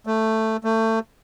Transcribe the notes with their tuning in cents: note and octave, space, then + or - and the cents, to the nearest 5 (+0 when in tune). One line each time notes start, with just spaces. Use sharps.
A3 +5
A3 +25